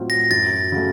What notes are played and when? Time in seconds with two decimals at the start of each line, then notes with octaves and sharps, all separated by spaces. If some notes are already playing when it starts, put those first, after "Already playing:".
Already playing: A2 F#3 C4 F4
0.10 A#6
0.31 F#2 A6
0.72 C#3 F#3 A3